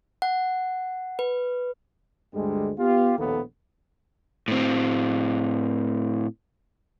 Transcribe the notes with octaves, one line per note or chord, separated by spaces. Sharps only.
F#5
B4
D2 G2 D3 G3 G#3
B3 F4 G4
A#1 D#2 A2 A#3 B3 A4
A2 C4